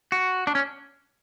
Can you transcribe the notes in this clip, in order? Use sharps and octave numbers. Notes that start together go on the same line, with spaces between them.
F#4
D4
C#4